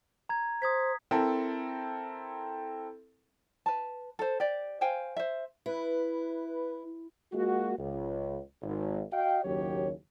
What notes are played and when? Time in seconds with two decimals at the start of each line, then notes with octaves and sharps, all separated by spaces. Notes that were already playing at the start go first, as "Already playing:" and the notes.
0.29 A#5 G#6
0.62 C5 D#6 G#6 B6
1.11 C4 E4 A4 A#4
3.66 B4 A5
4.19 A4 C5
4.40 G4 D5
4.81 C5 F5 G5 G#5
5.16 C5 E5
5.66 E4 B4
7.33 G#3 A#3 F4 F#4
7.79 C#2
8.62 G#1
9.12 F#4 D#5 F5 G5
9.43 F#1 D#2 F#3 C#4 G4 C#5